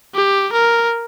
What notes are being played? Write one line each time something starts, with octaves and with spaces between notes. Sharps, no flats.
G4
A#4